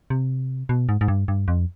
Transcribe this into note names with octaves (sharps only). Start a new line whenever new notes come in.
C3
B2
G#2
G#2
G2
G2
F2